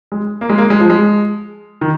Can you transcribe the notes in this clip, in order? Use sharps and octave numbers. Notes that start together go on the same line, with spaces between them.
G#3
A#3
G#3
A#3
G#3
F3
G#3
D#3